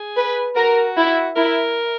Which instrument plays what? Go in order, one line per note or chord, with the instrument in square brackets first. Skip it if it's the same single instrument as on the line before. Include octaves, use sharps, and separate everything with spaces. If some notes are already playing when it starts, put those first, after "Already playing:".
Already playing: [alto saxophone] G#4
[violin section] B4
[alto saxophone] F#4 [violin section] A#4
[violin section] E4
[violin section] E4 [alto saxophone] A#4